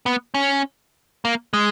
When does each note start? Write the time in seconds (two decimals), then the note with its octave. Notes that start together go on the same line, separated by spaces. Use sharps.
0.06 B3
0.34 C#4
1.25 A#3
1.53 G#3